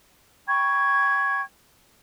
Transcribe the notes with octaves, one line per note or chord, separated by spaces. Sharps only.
G5 B5 C#6 G#6